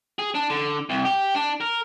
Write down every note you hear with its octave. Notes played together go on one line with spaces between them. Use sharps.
G#4
D4
D3
C2
G4
D4
A#4